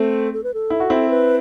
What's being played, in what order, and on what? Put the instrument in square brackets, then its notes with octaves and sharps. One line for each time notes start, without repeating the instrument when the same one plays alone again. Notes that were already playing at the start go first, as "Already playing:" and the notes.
Already playing: [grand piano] A3 C4 [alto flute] A4
[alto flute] A4
B4
A4
[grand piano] E4
F#4
C4 E4
[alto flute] B4